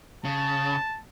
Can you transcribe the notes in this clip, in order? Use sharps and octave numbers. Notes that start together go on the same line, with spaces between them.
C#3 A5